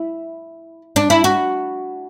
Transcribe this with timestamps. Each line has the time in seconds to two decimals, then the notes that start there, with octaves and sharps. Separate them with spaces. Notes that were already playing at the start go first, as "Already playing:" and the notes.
Already playing: E4
0.96 D4
1.10 E4
1.24 F#4